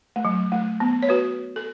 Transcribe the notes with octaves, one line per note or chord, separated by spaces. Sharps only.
A3
F#3
A3
B3
C#5
F#4 B4
A4